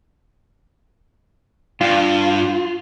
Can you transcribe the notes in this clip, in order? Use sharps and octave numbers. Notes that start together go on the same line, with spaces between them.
G2 F4